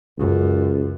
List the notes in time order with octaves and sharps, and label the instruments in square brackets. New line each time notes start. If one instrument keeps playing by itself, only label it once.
[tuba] C#2 [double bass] F#2